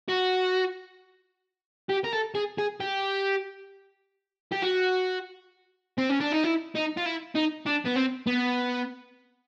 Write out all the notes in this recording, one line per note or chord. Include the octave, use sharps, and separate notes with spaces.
F#4
G4
A#4
A4
G#4
G#4
G4
G4
F#4
C4
C#4
D4
D#4
E4
D#4
F4
E4
D#4
D4
B3
C4
B3